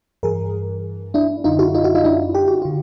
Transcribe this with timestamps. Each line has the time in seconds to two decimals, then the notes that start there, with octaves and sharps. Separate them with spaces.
0.23 G2 E3 G#4 A#4
1.14 D4 E4
1.44 F#2 D3 D#4 F4
1.59 E4 F#4
1.74 D#4 F4
1.84 E4 F#4
1.95 D#4 F4
2.04 D4 E4
2.35 G4
2.48 F#4
2.62 D3 F4